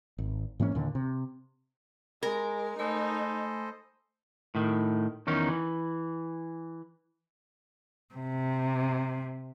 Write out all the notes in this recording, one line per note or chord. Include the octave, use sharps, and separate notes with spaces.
G#1
G#2 E3 A#3 C#4
D#2 A#2 D3
C3
G#3 A#4
A3 D#4 A4 C5 D#5 G#5 B5
A2 D#3
E2 D#3 C#4 D#4
E3
C3